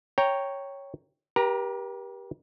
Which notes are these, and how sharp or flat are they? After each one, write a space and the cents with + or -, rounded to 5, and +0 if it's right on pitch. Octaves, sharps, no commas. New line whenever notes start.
C#5 +0 G5 +0 A#5 +0
G4 +0 A#4 +45 A#5 +0